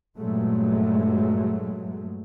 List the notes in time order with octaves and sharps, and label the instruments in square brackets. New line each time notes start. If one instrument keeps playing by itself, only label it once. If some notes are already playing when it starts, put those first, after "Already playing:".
[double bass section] G2 A#2 F#3 G#3 A3